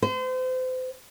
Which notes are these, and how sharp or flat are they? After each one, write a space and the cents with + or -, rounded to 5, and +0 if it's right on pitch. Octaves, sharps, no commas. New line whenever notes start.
C5 -35